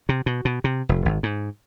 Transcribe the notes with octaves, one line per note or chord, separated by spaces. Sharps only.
C3
B2
B2
C3
F1
G#1
G#2